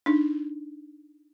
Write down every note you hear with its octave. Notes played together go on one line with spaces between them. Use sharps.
D4 D#4